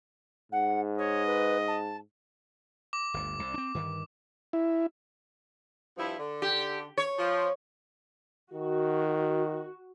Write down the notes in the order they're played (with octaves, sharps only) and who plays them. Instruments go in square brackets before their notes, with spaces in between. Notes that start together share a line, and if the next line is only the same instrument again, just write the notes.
[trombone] G#2 [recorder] F#5
[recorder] C#5 [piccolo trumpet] D#5
[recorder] B4
A5
[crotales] D6
[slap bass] G1 D2
C2
C4 D4
G2 D3 D#3
[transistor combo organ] E4
[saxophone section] G2 F3 E4
D3
[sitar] G4
C#5
[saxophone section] F3
[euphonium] D#3 [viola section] F#4